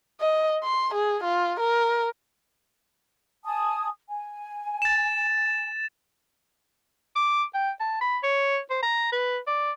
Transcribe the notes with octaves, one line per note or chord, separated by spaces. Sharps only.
D#5
C6
G#4
F4
A#4
G#5 A5 D#6
G#5
A6 E7
D6
G5
A5
B5
C#5
C5
A#5
B4
D5